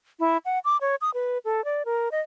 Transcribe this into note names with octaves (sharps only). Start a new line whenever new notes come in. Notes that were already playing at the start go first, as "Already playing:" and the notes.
E4
F#5
D6
C#5
D#6
B4
A4
D5
A#4
D#5